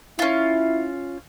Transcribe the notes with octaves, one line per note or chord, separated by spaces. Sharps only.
C#4 E4 F4